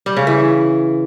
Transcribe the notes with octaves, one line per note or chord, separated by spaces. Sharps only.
G3
C#3
E3